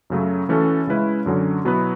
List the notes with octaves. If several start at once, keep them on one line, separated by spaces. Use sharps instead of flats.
F#2 C#3 F#3 A3
E3 A3 C#4 F#4 A4
C#3 G#3 C#4 E4 B4
F#2 D3 F#3 C#4
B2 F#3 B3 E4 B4